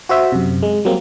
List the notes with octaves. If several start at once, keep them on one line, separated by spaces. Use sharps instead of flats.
F#4 C5 E5
F#2 C3
G#3
F#3 G3 A#3 C4